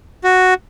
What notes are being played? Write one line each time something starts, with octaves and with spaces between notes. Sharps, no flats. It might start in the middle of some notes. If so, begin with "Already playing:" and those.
F#4